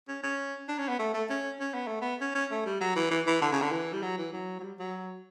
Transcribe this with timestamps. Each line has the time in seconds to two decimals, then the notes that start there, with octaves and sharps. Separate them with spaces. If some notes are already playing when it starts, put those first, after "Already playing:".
0.08 C#4
0.23 C#4
0.69 D4
0.79 C#4
0.88 B3
0.99 A3
1.14 A3
1.30 C#4
1.60 C#4
1.74 B3
1.87 A3
2.01 B3
2.21 C#4
2.35 C#4
2.51 A3
2.66 G3
2.81 F#3
2.96 E3
3.11 E3
3.27 E3
3.41 D3
3.52 C#3
3.62 D3
3.72 E3
3.93 G3
4.02 F#3
4.18 E3
4.33 F#3
4.59 F#3
4.63 G3
4.79 F#3